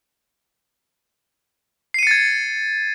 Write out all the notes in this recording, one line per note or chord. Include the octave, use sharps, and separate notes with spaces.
G#6 A6 C7 C#7 D#7